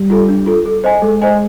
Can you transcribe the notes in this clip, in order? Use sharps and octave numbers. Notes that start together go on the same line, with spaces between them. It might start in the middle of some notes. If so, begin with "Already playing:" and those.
Already playing: G3
F4 A4
D4
F4 A4
A4
C5 D#5 G#5
G#3 A4
C5 D#5 G#5